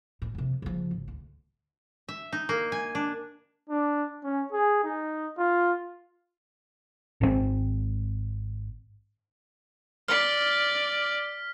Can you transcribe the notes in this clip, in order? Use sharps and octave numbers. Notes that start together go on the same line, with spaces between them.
A2
F2 C3
C#3 F3
G#1
D2
E5
D#4
A#3
G#5
D4
D4
C#4
G#4
D#4
F4
G#1 B2 C4
D5 F6 B6